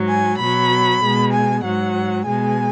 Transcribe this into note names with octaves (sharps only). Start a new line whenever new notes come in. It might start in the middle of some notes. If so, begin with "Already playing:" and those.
Already playing: G#2 F#3
G#5
B2 F#3 B5
B2 G#3
G#5
G#2 F#3 F#5
B2 G#3 G#5